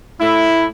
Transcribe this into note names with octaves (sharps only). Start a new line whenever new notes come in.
A2 A3 E4